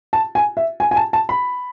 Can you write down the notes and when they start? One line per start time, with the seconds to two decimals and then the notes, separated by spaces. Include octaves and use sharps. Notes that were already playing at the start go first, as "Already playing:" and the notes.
0.13 A5
0.35 G#5
0.57 E5
0.80 G#5
0.91 G#5
0.96 A5
1.13 A5
1.29 B5